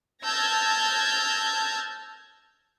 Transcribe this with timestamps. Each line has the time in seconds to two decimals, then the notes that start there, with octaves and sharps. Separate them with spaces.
0.25 A5 E6 F6 G6 G#6 A#6